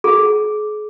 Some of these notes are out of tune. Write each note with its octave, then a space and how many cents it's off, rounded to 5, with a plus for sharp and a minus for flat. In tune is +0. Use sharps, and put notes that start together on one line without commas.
G#4 +35